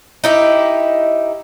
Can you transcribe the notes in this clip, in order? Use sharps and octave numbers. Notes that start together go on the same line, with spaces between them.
D#4 E4 G4